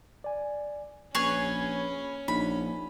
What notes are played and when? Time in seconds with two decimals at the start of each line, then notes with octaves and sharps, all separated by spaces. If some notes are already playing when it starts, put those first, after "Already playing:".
0.24 D5 G#5
1.15 A#1 C#4 G#4 B4 C#5 G#5 G#6
2.28 A#1 D4 D#4 B5